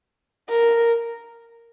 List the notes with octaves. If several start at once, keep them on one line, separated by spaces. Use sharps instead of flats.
A#4